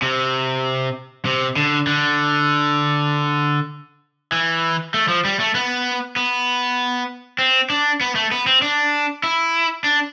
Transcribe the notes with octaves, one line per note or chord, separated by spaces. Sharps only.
C3
C3
D3
D3
E3
A3
F3
G3
A3
B3
B3
C4
D4
B3
A3
B3
C4
D4
E4
D4